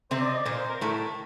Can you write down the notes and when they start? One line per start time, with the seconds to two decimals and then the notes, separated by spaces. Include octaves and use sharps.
0.11 C3 C4 C5
0.20 D5
0.28 D#5
0.37 D5
0.45 A#2 A#3 C5
0.57 C5
0.69 A#4
0.81 A2 A3 A#4